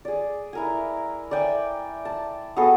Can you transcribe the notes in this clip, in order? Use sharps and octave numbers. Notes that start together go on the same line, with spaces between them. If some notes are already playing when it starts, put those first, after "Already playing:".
G#4 D5
E4 A#4 G#5
D5 E5 G5 G#5
A5
B3 F#4 G#4 A4